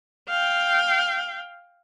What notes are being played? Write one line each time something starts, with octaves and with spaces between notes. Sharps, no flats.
F5 G5